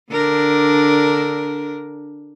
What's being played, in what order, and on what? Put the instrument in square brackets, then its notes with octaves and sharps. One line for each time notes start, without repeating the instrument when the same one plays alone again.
[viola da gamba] D3 D4 A#4